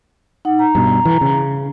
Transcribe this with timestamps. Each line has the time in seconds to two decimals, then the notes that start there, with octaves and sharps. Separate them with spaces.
0.45 D#4 F#5
0.59 A#5
0.75 G2 B2
1.05 E3
1.21 C#3